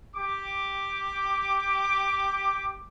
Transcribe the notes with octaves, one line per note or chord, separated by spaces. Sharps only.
G4 D6